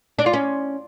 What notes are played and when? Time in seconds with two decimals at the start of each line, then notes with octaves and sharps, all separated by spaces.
0.19 D4
0.26 F4
0.33 C#4